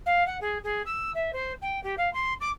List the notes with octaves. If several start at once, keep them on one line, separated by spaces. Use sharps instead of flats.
F5
F#5
G#4
G#4
E6
E5
C5
G5
G4
F5
C6
D6